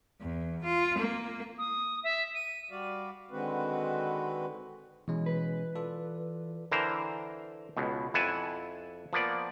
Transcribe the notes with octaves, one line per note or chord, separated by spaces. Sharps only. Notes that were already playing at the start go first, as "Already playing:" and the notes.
E2
F4
A#3
D#6
E5
D#7
G3 F#4 D5 F5
D3 D#3 G#3 C4 F#4 B4
B2 E3 G#3 C#4
B4
F4 A4 D5
D3 E3 A#4 C5
C#2 B2
F2 E4 F#5 G#5 A5
F3 A#3 B3 D5